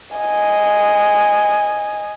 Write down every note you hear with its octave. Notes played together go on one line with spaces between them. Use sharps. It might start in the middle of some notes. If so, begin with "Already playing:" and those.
D#5 G#5